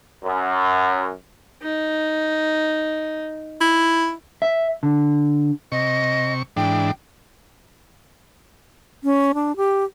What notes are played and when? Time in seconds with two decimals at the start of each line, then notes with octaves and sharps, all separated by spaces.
0.23 F#2
1.63 D#4
3.61 E4
4.42 E5
4.83 D3
5.72 C3 D#5 C#6
6.57 G#2 E3 D4 G5
9.04 C#4
9.34 D4
9.56 G4